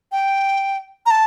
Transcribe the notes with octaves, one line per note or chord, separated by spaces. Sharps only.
G5
A#5
A5